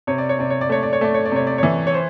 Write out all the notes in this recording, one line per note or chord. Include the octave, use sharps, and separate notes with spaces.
C3 C#5
D5
C#5
C3 D5
C#5
D5
A3 C#5
D5
C#5
A3 D5
C#5
D5
C3 C#5
D5
E3 C#5
C#5
C5